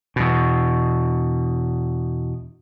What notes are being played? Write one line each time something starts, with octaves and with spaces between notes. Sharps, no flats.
E2 B2